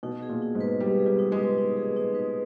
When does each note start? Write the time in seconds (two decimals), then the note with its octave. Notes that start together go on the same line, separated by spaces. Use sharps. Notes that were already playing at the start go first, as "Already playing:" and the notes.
0.03 B2 D#4
0.22 G#4
0.29 A#2
0.42 D#4
0.55 G#2
0.61 B4
0.80 G3 D#4
0.99 G#4
1.06 G3
1.19 D#4
1.32 G#3
1.38 B4
1.58 D#4
1.77 G#4
1.96 D#4
2.15 B4